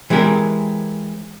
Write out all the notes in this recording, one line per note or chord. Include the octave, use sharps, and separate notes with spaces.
E3 G#3 C4 G4 A#4